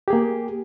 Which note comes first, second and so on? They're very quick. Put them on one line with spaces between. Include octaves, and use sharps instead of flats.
G4 G#4 A#3